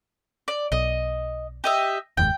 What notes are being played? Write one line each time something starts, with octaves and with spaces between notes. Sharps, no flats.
D5
B1 D#5
G4 D#5 E5
F1 D#2 G#2 G5